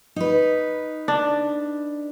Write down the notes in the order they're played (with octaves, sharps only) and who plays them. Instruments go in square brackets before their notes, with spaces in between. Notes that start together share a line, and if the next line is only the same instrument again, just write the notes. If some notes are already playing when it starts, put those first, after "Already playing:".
[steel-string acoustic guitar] D#4 B4
[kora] D4